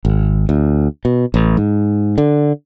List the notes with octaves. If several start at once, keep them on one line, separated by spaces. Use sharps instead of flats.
G#1
D2
B2
A1
G#2
D3